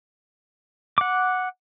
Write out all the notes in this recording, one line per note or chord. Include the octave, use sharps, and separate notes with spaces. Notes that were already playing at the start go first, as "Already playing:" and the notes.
F#5 D6